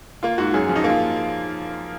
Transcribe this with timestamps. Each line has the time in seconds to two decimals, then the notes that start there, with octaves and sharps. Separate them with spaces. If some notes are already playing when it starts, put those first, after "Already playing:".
0.23 A#3 F4
0.38 G#2 F#4
0.54 F#2 G#4
0.69 F3
0.76 D#4
0.84 A#3
0.89 F4